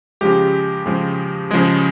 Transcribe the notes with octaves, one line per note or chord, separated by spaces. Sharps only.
C#3 F3 G#3 G4
C#3 F3 G#3
C#3 F3 G#3 G#4